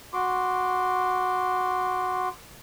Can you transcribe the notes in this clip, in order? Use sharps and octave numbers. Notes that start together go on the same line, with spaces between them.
F#4 C6 D6